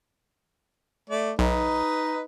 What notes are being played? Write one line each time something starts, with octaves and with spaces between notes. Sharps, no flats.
A3 D5
B1 D#4 B4 D#5